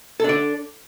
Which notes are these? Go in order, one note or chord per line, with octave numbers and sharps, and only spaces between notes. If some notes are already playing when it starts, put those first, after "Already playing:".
D4 A4 D5